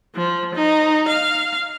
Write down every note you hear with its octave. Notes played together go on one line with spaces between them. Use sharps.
F3
D#4
F5